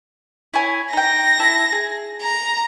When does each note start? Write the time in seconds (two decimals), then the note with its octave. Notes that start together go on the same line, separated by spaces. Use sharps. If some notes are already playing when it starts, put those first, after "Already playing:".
0.54 E4 C#5 G#5
0.93 D#4 G5 A#6
1.39 E4 E5 A5
1.72 G#4
2.22 A#5